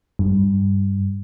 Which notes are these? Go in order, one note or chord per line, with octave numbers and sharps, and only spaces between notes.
G2